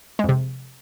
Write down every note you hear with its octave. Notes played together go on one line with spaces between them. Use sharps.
F2 C3 G#3